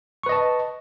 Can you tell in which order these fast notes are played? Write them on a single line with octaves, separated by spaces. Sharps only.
C#6 B4 D#5 A5